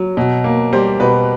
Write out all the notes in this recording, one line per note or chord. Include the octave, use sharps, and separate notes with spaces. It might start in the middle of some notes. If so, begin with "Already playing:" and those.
Already playing: F#3
B2
A#3
G3 C5
B2 B4